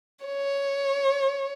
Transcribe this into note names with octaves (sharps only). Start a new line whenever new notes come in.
C#5